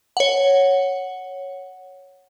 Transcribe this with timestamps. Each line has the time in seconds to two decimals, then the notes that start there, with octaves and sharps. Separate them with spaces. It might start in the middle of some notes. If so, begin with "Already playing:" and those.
0.17 C#5 F#5